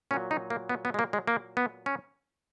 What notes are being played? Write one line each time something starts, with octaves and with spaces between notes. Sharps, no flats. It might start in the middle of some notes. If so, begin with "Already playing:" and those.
A#2 F#3 C#4
D#4
A#3
B3
B3
G#3
A#3
G#3
A#3
B3
C#4